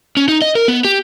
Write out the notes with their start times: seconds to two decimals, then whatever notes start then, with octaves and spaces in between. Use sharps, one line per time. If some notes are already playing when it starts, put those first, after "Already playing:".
0.17 C#4
0.28 D#4
0.42 D#5
0.55 A#4
0.68 B3
0.84 G4